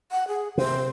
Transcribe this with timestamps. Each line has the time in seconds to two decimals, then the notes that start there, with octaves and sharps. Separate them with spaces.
0.11 F#5
0.28 G#4
0.58 C3 C5